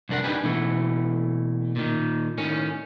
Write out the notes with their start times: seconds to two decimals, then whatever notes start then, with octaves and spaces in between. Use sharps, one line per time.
0.09 C2 F2 D4 A#4 F#5
0.24 D4 D#4 G4 B4 G#5
0.44 B2 E3 A3
1.76 A#2 D#3
2.38 A2 D#3 C#4